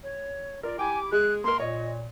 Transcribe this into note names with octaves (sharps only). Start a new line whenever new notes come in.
C#5
F4 A#4 D5
E4 G4 G5 G#5 D6
G#3 G#4 F#6
A#3 A#4 C6
A#2 C#5 D#5